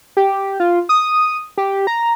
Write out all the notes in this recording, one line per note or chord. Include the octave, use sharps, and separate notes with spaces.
G4
F4
D#6
G4
A#5